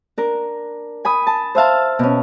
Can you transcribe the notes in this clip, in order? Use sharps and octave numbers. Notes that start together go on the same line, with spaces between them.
D4 A#4
G#5 B5 D#6
A5
C5 E5 F5 A5
B2 C#4